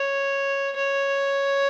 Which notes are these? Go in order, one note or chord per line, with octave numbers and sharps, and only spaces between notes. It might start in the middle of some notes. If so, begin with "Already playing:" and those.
Already playing: C#5
C#5